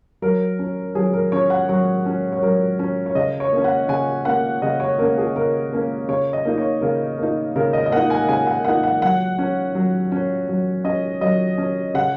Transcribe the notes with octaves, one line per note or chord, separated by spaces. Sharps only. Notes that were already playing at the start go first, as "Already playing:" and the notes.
F#3 A#4
C#4
F#3 G#4
A#4
C#4 C#5
F#5
F#3 C#5
C#4
C#5
F#3 A#4
C#4
C#5
C#3 D#5
C#5
A#3
C#4
F#5
C#3 G#5
A#3 C#4 F#5
C#3 D#5
C#5
A#3 C#4 A#4
G#4
C#3 A#4
A#3 C#4
C#3 C#5
D#5
A#3 D#4
C#5
C#3 A#4
A#3 D#4
C#3 A#4
D#5
D#5
A#3 F#5
D#4
G#5
C#3 G#5
F#5
A#3 D#4 F#5
F#5
F#3 F#5
C#4
F#3
C#4
F#3
C#4 D#5
F#3 D#5
C#4
C#3 F#5